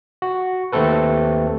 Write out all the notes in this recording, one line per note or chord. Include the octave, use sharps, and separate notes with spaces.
F#4
D#2 A3 C4 A4 B4